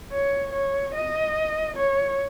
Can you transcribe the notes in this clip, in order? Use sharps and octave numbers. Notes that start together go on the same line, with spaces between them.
C#5
C#5
D#5
C#5